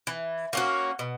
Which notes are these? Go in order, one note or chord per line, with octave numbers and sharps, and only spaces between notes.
E3
A#3 C#4 F#4
B2